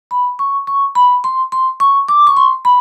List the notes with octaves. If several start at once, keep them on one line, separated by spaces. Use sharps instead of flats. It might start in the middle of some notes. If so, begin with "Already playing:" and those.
B5
C#6
C#6
B5
C6
C6
C#6
D6
C#6
C6
B5